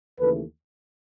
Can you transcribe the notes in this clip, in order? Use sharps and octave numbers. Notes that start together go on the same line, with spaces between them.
D#2 C#3 E3 A3 A4 B4